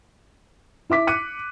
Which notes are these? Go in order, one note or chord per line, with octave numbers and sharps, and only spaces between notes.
E4 E5 D6 B6
D6 F#6 C#7 D#7